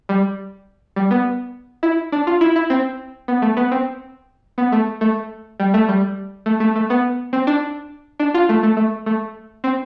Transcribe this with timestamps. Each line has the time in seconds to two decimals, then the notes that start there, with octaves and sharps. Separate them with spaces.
0.09 G3
0.96 G3
1.11 B3
1.83 E4
2.12 D4
2.27 F4
2.41 E4
2.56 E4
2.70 C4
3.28 B3
3.42 A3
3.57 B3
3.71 C4
4.58 B3
4.72 A3
5.01 A3
5.60 G3
5.74 A3
5.89 G3
6.46 A3
6.60 A3
6.76 A3
6.90 B3
7.33 C4
7.47 D4
8.19 D4
8.34 F4
8.49 A3
8.63 A3
8.77 A3
9.06 A3
9.64 C4